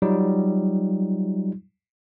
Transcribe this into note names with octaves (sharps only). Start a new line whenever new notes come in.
F#3 G3 D#4 F4